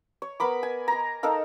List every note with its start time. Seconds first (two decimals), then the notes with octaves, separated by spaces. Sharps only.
0.22 C#5
0.40 B3 A#4 B5 D6
0.63 G#5
0.88 G#5 A#5
1.23 D#4 A4 A#4 F5